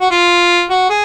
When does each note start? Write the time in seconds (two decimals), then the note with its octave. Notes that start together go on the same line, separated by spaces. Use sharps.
0.01 F#4
0.11 F4
0.70 F#4
0.89 G#4